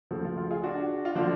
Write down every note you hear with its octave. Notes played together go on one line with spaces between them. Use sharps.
D2 C#3 F3 F#4 A4
F4
F4
F4 G#4
D4 F#4
F4
D3 F3 D4 F#4